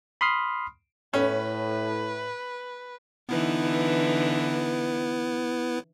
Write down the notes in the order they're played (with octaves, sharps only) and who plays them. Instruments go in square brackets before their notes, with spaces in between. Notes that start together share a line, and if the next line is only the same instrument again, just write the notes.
[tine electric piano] B5 C6 D#6 F6 C7
[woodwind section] A2 [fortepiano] C#4 [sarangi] B4
[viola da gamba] D3 E3 D#4 [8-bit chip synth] B3 E4 B4